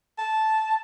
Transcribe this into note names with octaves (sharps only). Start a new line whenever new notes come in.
A5